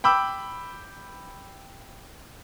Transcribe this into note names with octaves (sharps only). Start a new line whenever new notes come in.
G5 B5 D6 E6